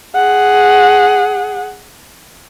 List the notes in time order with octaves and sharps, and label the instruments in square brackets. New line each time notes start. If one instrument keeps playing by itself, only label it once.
[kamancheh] G#4 F#5